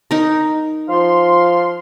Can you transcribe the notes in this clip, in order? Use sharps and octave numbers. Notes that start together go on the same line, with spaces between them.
D#4 A#4
F3 F5 C6